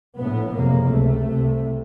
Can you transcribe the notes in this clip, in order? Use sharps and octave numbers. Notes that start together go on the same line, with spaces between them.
A#1 A2 B3
F#1 F2 C3 A#3
C#2 C3 A3
C2 C3